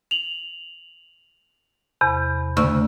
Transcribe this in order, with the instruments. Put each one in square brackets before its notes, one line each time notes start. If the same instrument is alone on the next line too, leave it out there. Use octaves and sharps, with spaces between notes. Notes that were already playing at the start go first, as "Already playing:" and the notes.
[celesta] F7 F#7
[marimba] E2 C3 [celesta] B5
[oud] D2 [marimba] C#3 C#6 E6